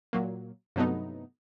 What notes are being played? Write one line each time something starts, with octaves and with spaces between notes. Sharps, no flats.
A#2 F#3 A#3
G2 C3 F#3 A3 B3 D#4